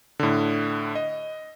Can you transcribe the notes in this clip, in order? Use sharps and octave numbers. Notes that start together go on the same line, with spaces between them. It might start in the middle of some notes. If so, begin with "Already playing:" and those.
A2 D3
D#5